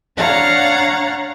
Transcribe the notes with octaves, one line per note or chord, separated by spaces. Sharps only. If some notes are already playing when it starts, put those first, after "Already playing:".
D4 C#5 F5 F#5 A#5 A6